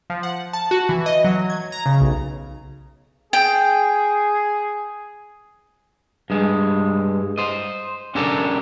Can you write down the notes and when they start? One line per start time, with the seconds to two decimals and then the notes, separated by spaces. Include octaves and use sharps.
0.10 F3
0.23 F#5
0.53 A5
0.71 F#4
0.89 E3
1.06 D#5
1.24 F#3
1.50 G#6
1.72 A#5
1.86 C#3
2.01 B1
3.33 G#4 G5
6.30 G2 G#3
7.38 C5 D#5
8.15 C#4 D4 G4 A4 A#4